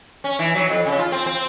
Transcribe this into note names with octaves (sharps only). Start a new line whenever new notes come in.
C#4
E3
F#3
F2
C#3
F4
C4
C4